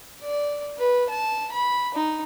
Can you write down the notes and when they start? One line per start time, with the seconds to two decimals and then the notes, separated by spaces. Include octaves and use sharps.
0.22 D5
0.78 B4
1.10 A5
1.52 B5
1.94 D#4